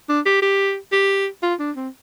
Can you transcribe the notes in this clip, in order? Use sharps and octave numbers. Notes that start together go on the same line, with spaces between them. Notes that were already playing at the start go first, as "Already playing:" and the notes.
D4
G4
G4
G4
F4
D4
C4